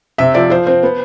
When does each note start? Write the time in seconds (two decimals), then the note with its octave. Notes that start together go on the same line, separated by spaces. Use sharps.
0.18 C3 E5
0.34 F3 D5
0.50 F3 C5
0.67 C4
0.83 B3